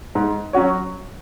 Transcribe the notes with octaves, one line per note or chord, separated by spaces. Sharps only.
G#2
F#3 C#4 F#4 C#5